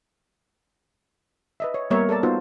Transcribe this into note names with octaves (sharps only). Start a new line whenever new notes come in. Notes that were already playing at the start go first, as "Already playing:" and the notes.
B4 D#5 E5
C#5
G3 A#3 B3 A#4 C#5 E5
A4 A#4 D5 A5
B3 D#4 F4 F#4 C5